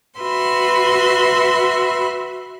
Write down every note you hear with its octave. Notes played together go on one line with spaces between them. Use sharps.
F#4 B4 E5 B5 C6